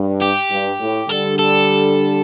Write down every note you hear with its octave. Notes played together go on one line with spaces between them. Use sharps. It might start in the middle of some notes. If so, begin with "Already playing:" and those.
Already playing: G2
G4
G2
A2
D3 G3 A4
A4